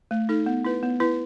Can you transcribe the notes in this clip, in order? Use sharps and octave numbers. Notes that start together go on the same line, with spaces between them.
A3
D#4 A4
B3
E4 B4
B3
E4 B4